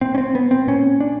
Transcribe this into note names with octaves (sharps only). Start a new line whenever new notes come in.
A#2 C4
C#4
C4
B3
C4
A#2 C#4
D4